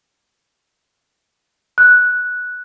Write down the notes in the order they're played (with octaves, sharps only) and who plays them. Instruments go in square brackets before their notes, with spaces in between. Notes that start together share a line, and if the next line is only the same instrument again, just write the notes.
[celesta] F#6